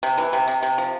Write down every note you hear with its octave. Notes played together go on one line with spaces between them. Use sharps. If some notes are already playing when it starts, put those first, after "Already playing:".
C3
E3
C3
C3
C3
F3